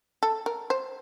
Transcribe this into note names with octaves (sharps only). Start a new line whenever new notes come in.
A4
A#4
C5